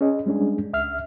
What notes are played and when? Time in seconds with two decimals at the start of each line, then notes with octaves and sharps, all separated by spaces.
0.01 C#4 G#4 D#5
0.26 G3 G#3 C#4 D4 G#4
0.73 C#2 E5 F6